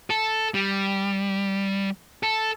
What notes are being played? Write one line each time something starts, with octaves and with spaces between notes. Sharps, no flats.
A4
G3
A4